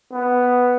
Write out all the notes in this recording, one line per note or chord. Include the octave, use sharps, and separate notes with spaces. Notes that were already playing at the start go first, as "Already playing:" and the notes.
B3